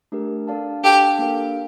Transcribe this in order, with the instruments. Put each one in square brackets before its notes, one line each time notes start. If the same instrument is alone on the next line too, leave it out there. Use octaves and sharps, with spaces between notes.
[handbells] A3 D4 G4 A#4
D4 A4 D5 F5 A5
[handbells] D4 A4 D5 F5 A5 [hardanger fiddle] G4
[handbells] A#3 D4 G4 A#4 F5